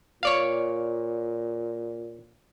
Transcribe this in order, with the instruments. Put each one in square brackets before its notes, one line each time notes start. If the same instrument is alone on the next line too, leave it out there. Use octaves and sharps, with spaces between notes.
[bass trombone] A#2 [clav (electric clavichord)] C#5 D5 F5